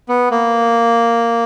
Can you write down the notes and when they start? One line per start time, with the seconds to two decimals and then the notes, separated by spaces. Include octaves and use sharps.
0.08 B3
0.31 A#3